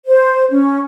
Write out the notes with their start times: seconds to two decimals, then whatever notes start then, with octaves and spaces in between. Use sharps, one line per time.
0.06 C5
0.50 C#4